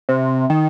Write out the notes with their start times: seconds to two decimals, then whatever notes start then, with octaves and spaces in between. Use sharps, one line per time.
0.09 C3
0.50 D#3